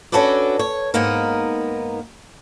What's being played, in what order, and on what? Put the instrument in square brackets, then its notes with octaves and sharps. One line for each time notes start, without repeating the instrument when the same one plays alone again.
[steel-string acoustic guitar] C#4 D4 F#4 A4 B4 D5
C#5
G#2 A#3 B3 D#4 A#4